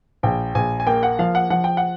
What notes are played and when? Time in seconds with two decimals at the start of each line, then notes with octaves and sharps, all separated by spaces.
0.23 A#1 G5
0.55 A#1 G#5
0.80 G#5
0.87 A#3 G5
1.03 F#5
1.19 F3 F5
1.35 F#5
1.50 F3 F#5
1.64 G5
1.77 F#5